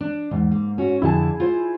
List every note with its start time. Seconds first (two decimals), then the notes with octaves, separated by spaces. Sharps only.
0.01 D4
0.31 E2 G#2
0.51 A#3
0.78 C#4 F#4
1.02 F2 D3 E4 G#4 G#5 A5
1.40 F4 C5